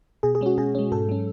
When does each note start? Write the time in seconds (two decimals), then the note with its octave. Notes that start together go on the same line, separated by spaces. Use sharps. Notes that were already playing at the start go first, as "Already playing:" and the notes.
0.23 B2 G#4
0.35 G#4
0.41 G#3 C#4 F#4
0.58 B2 G#4
0.75 G#3 C#4
0.92 G#2 A4
1.09 F#3 C#4